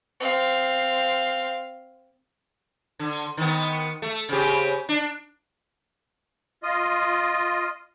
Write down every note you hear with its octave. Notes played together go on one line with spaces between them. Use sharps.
C4 F5
D3
D#3 B3
A3
C#3 C4 G4
D4
F4 D#5